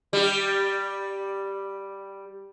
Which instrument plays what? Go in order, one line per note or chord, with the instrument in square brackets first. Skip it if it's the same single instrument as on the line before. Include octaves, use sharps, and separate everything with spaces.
[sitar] G3 G4